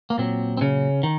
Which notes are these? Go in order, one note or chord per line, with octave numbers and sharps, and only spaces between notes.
A#3
A#2 F#3 C4
C4
C#3 C#4
D#3